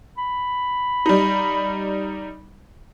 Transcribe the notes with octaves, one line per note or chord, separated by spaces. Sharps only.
B5
G3 D#4